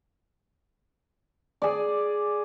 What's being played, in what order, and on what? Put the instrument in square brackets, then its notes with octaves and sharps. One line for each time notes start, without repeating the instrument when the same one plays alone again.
[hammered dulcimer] G#4 D5